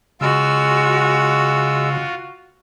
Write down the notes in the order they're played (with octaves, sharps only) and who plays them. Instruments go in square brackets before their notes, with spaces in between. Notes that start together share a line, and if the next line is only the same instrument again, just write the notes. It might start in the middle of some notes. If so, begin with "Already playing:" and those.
[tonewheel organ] C#3 [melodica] G#3 E6 [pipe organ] F4 [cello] F#4